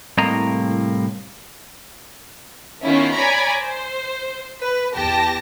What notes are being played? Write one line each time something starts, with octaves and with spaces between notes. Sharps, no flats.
C2 A2 C3 A#3 D#5 A#5
D#3 B3 C#4 E4 F4
C#5 D5 G#5 A#5 B5
C5
B4
E2 G4 A5 A#6